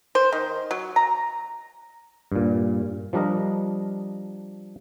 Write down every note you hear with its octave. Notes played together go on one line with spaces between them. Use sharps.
C5
D#3
F#3
A#5
G2 A#2
F3 G3 D4 A#4 D#5